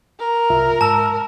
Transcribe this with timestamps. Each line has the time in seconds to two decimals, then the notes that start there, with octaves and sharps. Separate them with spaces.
0.20 A#4
0.50 C2 F4 E5
0.81 G#2 A5 E6